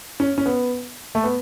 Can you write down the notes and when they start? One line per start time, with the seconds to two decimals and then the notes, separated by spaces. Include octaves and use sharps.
0.20 C#4
0.38 C#4
0.46 B3
1.15 A3
1.24 B3